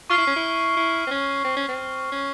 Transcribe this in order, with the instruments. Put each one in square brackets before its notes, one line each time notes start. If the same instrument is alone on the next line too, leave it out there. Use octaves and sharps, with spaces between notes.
[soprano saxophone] F4 [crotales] C#6 F6 C7
[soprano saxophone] E4
C#4
E4
E4
C4
C#4
C4
C#4
C4
C#4